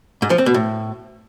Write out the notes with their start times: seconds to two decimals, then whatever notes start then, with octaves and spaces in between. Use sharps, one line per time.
0.22 G#2
0.30 F3
0.38 C4
0.46 B2
0.54 A2